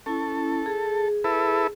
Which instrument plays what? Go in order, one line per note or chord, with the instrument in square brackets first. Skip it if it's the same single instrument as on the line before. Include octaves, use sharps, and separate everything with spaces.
[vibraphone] C#4 E4 [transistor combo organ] A4
[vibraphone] G#4
[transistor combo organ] E4 A4 B4